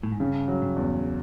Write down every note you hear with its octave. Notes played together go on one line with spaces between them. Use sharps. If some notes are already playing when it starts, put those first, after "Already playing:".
A2
G#2
G2 C#3
F#3
G2
E2